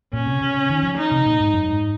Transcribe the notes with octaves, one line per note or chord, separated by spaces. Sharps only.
A#2 C#4
C3
C#3
D#3
F3
D#4
C3
A#2
G#2
F#2
G#2